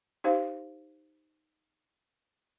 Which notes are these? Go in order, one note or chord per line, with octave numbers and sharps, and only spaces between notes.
D#4 G4 C5 F5